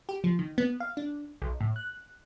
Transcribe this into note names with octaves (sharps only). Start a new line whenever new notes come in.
G4
F3
D#3
B3
F5
D4
B1
A2
F#6